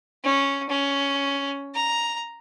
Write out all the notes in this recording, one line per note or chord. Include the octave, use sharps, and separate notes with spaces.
C#4
C#4
A#5